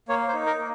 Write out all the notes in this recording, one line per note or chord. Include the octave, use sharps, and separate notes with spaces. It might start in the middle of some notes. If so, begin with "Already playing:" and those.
A#3 C#5
C5
D#4
A#4
A#3